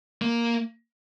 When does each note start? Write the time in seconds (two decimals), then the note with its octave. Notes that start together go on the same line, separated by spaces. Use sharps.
0.22 A#3